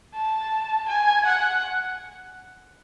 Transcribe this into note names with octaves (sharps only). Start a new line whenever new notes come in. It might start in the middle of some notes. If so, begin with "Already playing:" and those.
A5
G#5
F#5